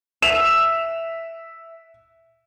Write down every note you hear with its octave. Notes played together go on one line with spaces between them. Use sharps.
E5 E7 F7